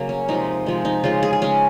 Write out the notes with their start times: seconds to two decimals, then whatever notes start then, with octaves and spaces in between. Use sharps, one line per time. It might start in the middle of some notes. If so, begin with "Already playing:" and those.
Already playing: C#3 F#3 A#3
0.09 C#4
0.28 C3 F3 G#3 D#4
0.66 C3 F3 G#3
0.85 D#4
1.04 C#3 G#3 F4
1.23 G#4
1.33 G#4
1.42 C#3 G#3 C#4